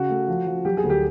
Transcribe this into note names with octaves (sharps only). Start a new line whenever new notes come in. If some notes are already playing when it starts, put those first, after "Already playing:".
Already playing: C#3 F#4
A3
F3
F3
F#3 G4
G#4
D2
G4